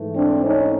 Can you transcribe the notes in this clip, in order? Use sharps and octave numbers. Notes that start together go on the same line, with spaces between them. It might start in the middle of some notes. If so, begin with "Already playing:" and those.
Already playing: G#2 E3 A3
C4 D4
C#4 D#4